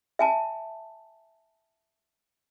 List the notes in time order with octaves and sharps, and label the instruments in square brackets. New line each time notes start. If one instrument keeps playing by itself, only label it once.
[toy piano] E5 G#5 A5